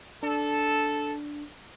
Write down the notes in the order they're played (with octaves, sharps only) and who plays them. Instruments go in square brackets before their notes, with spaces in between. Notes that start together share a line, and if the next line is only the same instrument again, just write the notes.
[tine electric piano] D4 [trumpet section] A4